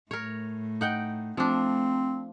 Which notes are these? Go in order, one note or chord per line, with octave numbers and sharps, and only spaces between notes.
A2 A#4 C#5
D#4 F#5 G5
F3 A3 C4 D4